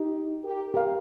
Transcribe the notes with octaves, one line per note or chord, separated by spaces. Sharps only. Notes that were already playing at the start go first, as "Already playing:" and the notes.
Already playing: D#4 G4
G4 A#4
G4 A#4 F5